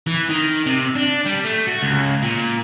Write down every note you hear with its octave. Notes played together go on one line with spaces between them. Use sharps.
E3
D#3
C3
D4
G3
A3
F#4
C#2
A#2